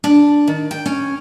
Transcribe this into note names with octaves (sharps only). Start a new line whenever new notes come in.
D4
D#3
G5
C#4